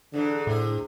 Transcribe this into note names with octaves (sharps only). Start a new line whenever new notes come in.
G#2 D3 E3 D4
A2 C3 G#4